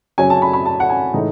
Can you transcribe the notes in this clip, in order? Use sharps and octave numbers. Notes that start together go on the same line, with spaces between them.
F#2 C#3 F#3 C#4 G#5
A5
B5
B5
A5
F#5
G#5
A2 E3 G#3 D#4